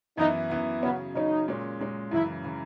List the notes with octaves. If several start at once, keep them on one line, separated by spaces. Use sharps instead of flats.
F#2 E3 B3 D#4 E4
F#2 E3 B3 E4
C#3 F#3 B3 C#4
C#3 F#3 C#4 D#4
A#2 G#3 C#4
A#2 G#3 C#4
F#2 C#3 E3 E4
C#3 E3